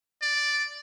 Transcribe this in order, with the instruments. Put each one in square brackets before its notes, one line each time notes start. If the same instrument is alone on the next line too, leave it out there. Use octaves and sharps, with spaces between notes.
[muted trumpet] D5